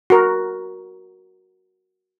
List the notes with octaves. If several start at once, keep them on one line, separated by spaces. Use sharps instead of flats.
F#4 A#4